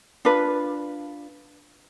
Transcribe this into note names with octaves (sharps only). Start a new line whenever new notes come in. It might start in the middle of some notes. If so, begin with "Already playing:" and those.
D4 F4 B4